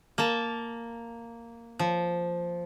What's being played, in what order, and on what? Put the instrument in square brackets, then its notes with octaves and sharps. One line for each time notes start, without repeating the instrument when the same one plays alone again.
[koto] A#3 A5
F3